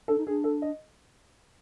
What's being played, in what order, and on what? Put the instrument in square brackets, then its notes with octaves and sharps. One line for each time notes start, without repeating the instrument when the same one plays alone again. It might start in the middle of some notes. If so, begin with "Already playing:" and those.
[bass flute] D4 [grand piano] A4
[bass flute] D#4
[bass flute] D4 [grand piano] G#4
[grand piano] A4
D#5